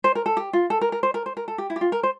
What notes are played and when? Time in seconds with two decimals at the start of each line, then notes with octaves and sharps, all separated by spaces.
0.04 C5
0.15 A#4
0.26 A4
0.37 G4
0.53 F4
0.70 A4
0.81 A#4
0.92 A#4
1.03 C5
1.14 A#4
1.26 C5
1.37 A#4
1.48 A4
1.58 G4
1.70 E4
1.76 G4
1.81 F4
1.92 A#4
2.03 C5